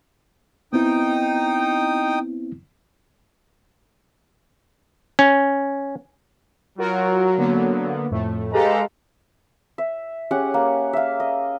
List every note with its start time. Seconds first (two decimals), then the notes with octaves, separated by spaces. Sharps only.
0.73 B3 C4 D#4 E4 G5 D#6
5.19 C#4
6.78 F#3 F4 F#4 A#4
7.38 D3 A#3 B3
8.11 F2 A2 A3
8.53 G#3 G4 A4 B4 F5 A#5
9.78 E5
10.31 C#4 G4 G#4 F#5
10.54 A#3
10.93 E5 F5
11.20 D#5